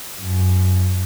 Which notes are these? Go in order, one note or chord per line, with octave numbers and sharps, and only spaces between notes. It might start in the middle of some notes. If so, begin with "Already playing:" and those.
F#2